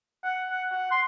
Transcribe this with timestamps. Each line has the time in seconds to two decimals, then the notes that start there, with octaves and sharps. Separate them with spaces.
0.24 F#5
0.50 F#5
0.71 F#5
0.91 C6